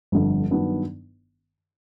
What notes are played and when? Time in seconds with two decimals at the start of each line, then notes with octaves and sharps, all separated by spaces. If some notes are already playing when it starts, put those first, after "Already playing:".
0.12 G1 F2 D3
0.51 G2 D#3 F#3 B3 D4